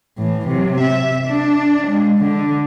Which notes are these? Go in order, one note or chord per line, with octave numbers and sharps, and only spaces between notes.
A2 E3
C3 F#3
E5
D4
G#3
D3